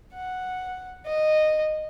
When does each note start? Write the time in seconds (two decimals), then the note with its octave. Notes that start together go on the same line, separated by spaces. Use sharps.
0.14 F#5
1.06 D#5